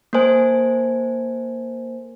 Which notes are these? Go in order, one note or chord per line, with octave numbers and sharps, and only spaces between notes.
A#3 A4 A#4 C5 G#5